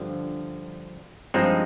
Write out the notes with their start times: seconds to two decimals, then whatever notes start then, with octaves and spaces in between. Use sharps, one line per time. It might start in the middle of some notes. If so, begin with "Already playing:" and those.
Already playing: G2 D3 F3
1.34 G2 F3 G#3 C4 D#4